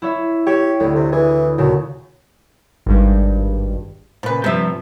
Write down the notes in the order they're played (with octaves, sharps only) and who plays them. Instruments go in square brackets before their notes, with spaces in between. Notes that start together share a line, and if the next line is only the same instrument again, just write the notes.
[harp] E4 C#5 E5
[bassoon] G4 [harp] C#5 E5
[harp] D2 [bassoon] A2
[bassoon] C3
[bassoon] E3 [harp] G#4
[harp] D#2 A#2 C#3 [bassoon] F#3
[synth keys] G#1 G2
[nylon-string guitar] A#2 C#3 [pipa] F3 B4
[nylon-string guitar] G2 G3 [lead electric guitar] C3 F3 [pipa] C5 E5